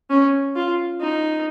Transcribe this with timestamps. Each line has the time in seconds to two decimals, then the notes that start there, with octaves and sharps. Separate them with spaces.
0.10 C#4
0.56 F4
1.01 D#4